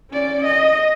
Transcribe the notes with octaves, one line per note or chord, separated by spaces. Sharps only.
C#4 D5
D#5